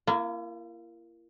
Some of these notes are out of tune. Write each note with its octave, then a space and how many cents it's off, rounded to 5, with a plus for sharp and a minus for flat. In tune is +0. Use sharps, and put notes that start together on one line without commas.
A#3 +0 E4 +45